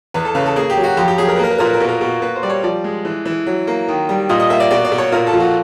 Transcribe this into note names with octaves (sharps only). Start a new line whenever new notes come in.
E2 B4
A4
C#3 B4
A4
A#3 G#4
G4
F#3
F#4
F2 G4
G4
F#3 G#4
A#4
B4
A#3 A#4
B4
A#2 A#4
B4
A#4
B2 B4
A#4
B2
A#3 B4
C5
G3 D5
C#5
F3 D5
G#3
E3
E3
F#3
A#3
D#3
G3
A#2 D#5
D#5
A#3 E5
D5
B2 D5
D5
B2
C#5
A#2 A#4
A4
F3
F#4